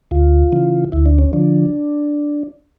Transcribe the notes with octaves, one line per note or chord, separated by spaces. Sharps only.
D2 F4
C#3 E3
D2 E4
D4
C#4
D3 F3 D4